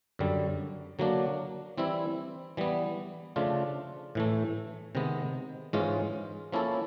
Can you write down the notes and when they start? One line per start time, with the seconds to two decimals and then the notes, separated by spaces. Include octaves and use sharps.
0.19 F#2 D3 G3
0.99 D3 F#3 A#3 D4
1.78 E3 G3 C4 E4
2.57 E3 G3 B3
3.36 C#3 F3 A3 D4 F4
4.15 A2 E3 A3
4.95 C3 D#3 G#3 B3
5.73 G#2 E3 G#3 C#4 F4
6.52 F3 A#3 C#4 E4 A4